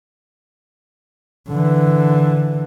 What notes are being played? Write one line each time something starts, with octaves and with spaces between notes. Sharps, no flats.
D3 E3